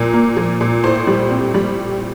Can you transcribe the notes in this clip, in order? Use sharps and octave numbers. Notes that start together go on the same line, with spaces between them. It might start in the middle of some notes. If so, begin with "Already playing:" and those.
Already playing: A#2 F3 A#4
A#3
F3
A#2
A2 C5
G3
C4
G3